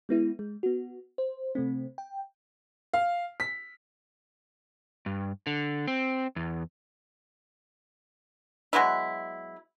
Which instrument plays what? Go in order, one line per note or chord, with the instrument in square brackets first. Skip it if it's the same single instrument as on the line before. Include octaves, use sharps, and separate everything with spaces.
[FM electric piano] G#3 B3 E4
G#3
B3 F#4
C5
C3 A3 C4
G5
[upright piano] F5
B6
[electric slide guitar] G2
D3
C4
E2
[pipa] F#3 G#3 B3 E4